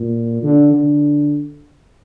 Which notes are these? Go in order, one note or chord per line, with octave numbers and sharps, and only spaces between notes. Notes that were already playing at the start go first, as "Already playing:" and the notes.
Already playing: A#2
D3
D3